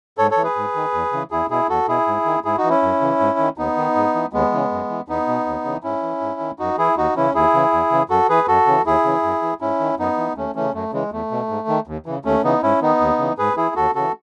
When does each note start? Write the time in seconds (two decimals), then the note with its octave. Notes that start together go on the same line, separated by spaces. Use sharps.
0.18 G#2 A4 C#5
0.31 A4 C#5
0.37 E3
0.43 G#4 B4
0.56 G#2
0.75 D#3
0.94 E2
1.13 C#3 E3
1.31 E2 E4 G#4
1.50 B2 E4 G#4
1.69 E2 F#4 A4
1.88 B2 E4 G#4
2.07 G#2
2.26 D#3
2.45 G#2 E4 G#4
2.57 D#4 F#4
2.64 E3
2.70 C#4 E4
2.82 F#2
3.01 C#3 E3
3.20 G#2
3.39 D#3
3.58 D#2 B3 D#4
3.77 D#3
3.95 G#2
4.15 E3
4.33 D#2 G#3 B3
4.52 C#3 E3
4.71 F#2
4.90 E3
5.08 E2 B3 D#4
5.28 B2
5.46 D#2
5.65 C#3 E3
5.83 G#2 C#4 E4
6.03 E3
6.21 G#2
6.40 D#3
6.59 F#2 D#4 F#4
6.78 E3 E4 G#4
6.97 D#2 D#4 F#4
7.16 C#3 E3 C#4 E4
7.34 D#2 E4 G#4
7.54 C#3 E3
7.72 E2
7.91 C#3 E3
8.10 F#2 F#4 A4
8.29 E3 G#4 B4
8.48 F#2 F#4 A4
8.66 C#3 E3
8.86 D#2 E4 G#4
9.04 C#3 E3
9.23 F#2
9.42 E3
9.61 G#2 C#4 E4
9.80 D#3
9.99 F#2 B3 D#4
10.18 E3
10.36 D#2 A3 C#4
10.55 C#3 E3 A3 C#4
10.74 F#2 A3
10.92 C#3 E3 G#3
11.12 E2 A3
11.31 B2
11.49 G#2
11.68 D#3
11.87 D#2
12.06 C#3 E3
12.25 D#2 A3 C#4
12.43 C#3 E3 B3 D#4
12.62 G#2 C#4 E4
12.81 D#3 B3 D#4
13.00 D#2
13.19 C#3 E3
13.38 G#2 G#4 B4
13.57 E3 E4 G#4
13.76 D#2 F#4 A4
13.95 C#3 E3 F#4 A4